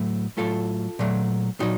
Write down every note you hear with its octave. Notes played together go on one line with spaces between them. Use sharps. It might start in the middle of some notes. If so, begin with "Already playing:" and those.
Already playing: A2 F#3 A3
A2 F#3 A3 F4 A4
A#2 F#3 A3
A#2 F#3 D#4 F#4